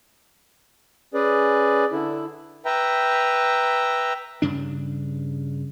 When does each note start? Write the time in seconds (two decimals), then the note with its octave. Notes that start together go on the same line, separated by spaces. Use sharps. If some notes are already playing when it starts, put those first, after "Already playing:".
1.14 C#4 G#4 B4 D5
1.92 D3 E4
2.65 B4 E5 G5 A#5
4.42 G2 C#3 D4